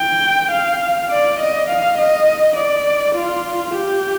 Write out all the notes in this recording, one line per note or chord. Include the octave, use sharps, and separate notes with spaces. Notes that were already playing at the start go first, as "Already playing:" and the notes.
Already playing: G5
F5
D5
D#5
F5
D#5
D5
F4
G4